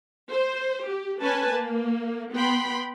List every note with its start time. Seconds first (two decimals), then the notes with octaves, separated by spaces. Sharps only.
0.31 C5
0.86 G4
1.21 C#4 B4 G#5 A5
1.52 A#3
2.32 B3 G5 B5 C6